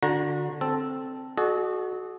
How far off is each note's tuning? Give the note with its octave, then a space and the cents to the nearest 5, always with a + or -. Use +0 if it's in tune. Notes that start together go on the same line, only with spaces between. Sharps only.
D3 +5 F#4 -30 A#5 +15
C4 +0 A4 +0
F#4 +0 A4 -45 D#5 -40